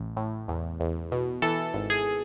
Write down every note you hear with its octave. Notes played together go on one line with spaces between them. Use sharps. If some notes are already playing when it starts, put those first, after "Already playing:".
Already playing: A1
A2
E2
E2
B2
E3 A4
G#1
G#4